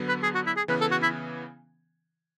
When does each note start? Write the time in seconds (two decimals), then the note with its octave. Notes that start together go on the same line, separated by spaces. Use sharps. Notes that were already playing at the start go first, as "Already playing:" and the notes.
Already playing: D3 F#3 B3
0.08 B4
0.23 G#4
0.35 F#4
0.47 E4
0.57 G#4
0.68 C#3 E3 B3 B4
0.81 A4
0.91 F#4
1.03 E4